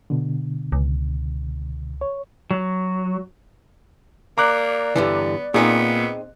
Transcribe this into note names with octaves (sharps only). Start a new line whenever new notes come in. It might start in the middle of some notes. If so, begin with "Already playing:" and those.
B2 D3
C#2
C#5
F#3
A#3 D5 A#5 D6 F#6
G2 D3 E3 B3
A#2 B3 C4 D#4 G#4